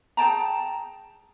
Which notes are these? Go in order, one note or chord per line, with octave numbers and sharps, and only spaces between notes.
G#4 G5 A5 A#5